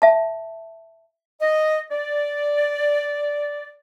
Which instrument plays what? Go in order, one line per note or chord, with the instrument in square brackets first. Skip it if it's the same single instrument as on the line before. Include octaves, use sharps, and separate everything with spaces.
[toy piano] E5 A5
[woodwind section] D#5
D5